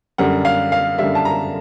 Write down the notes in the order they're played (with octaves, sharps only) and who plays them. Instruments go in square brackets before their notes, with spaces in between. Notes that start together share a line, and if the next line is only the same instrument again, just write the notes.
[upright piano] F#2 D3 G3 F#5
F5
F5
F#2 D3 G3 E5
A5
A#5